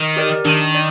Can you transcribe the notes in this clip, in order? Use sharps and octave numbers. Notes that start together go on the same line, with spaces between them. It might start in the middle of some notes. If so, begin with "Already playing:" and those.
Already playing: D#3
G4 A#4 D5
D#3 D4
D5